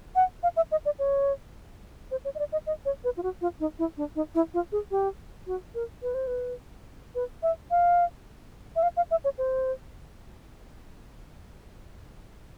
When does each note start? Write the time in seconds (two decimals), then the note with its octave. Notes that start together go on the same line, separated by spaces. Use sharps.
0.16 F#5
0.43 F5
0.56 E5
0.72 D#5
0.85 D5
0.99 C#5
2.11 C5
2.25 C#5
2.35 D#5
2.39 D5
2.52 D#5
2.67 D#5
2.85 C#5
3.04 B4
3.17 F4
3.23 F#4
3.41 F4
3.60 D#4
3.79 E4
3.97 D4
4.16 D#4
4.35 E4
4.54 F4
4.72 G#4
4.91 G4
5.47 F#4
5.75 A#4
6.03 B4
6.14 C5
6.27 B4
7.15 B4
7.43 E5
7.71 F5
8.76 E5
8.83 F5
8.97 F5
9.11 E5
9.24 C#5
9.38 C5